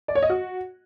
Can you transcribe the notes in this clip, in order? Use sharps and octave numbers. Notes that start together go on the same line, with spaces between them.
D5
C#5
D#5
F#4